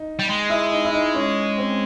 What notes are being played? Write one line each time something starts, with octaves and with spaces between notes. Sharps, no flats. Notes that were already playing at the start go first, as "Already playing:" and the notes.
Already playing: D#4
G3
G#3
E4
D#4
E4
D#4
C#4
C4